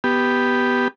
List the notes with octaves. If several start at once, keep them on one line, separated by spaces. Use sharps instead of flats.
B3 G4